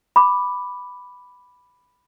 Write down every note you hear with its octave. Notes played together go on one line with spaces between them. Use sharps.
B5 D6